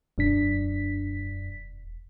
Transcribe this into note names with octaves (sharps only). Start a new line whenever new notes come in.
E1 F#2 D4 B6